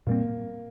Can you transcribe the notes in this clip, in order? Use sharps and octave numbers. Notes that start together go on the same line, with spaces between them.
A#2 G3 A#3 C4